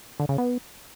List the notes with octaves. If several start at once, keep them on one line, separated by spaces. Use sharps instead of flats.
D3
C#3
B3